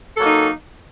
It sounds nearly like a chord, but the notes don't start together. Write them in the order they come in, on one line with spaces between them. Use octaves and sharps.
A4 F#3 A#3 D#4